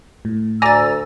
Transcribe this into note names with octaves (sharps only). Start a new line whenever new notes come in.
A2
D2 D5 G#5 A#5 E6 A6